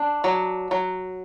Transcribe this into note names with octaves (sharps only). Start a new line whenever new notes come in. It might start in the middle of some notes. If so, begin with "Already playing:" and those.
Already playing: D4
F#3
F#3